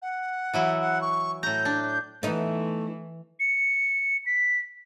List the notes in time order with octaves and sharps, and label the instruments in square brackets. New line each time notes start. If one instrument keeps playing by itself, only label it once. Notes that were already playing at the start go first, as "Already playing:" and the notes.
[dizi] F#5
[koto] E3 F#3 E4
[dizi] F#5
C#6
[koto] A2 A#5 [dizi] G6
[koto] D4
[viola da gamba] E3 [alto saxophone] A3 [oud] B3 D#4
[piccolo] C#7
B6